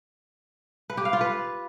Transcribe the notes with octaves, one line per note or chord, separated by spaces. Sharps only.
B4
G4
F5
F4
B4